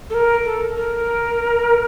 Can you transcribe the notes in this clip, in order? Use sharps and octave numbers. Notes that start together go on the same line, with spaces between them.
A4
A#4
A4
A#4